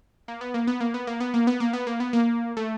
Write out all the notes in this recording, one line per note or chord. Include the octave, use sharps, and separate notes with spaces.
A#3
B3
A#3
B3
A#3
B3
A#3
B3
A#3
B3
A#3
B3
A#3
B3
A#3
A3